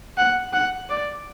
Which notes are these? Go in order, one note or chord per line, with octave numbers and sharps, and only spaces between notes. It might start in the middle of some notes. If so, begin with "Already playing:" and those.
F#5
F#5
D5